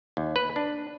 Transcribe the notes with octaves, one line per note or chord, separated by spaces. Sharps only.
D#2
B4
D4